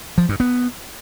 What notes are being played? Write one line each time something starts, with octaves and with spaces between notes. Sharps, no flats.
F3
G2
B3